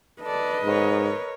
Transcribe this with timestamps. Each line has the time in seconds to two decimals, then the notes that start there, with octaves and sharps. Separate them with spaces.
0.22 A4 B4 D5 D#5
0.64 G#2 A#4 C#5